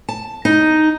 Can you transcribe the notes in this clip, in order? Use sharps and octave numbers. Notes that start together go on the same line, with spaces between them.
A5
D#4